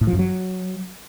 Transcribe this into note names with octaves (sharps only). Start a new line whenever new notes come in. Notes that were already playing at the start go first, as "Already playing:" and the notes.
A2
F3
F#2
F#3